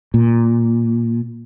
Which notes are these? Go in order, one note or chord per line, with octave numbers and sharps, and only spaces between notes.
A#2